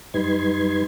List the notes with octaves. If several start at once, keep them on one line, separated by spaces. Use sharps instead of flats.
F#2 G3 D#4 B4 C6 G#6